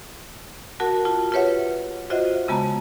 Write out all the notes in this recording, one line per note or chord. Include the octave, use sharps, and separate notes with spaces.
F#4 A#4 F#5 A5
F4 A5
F4 G4 B4 C#5 E5 F#5
F4 F#4 C5 D#5 E5 F#5
C#3 G#3 B3 A5 A#5